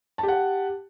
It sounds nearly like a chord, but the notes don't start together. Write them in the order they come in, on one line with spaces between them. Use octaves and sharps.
A5 G4 F#5